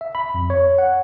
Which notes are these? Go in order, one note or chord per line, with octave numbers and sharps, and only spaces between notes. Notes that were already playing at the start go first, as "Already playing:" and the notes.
E5
B5
F2
C#5
F#5